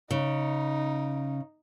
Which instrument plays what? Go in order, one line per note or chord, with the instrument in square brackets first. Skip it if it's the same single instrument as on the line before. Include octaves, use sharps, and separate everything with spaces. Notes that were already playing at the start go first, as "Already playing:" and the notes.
[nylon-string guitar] C#3 [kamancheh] D#4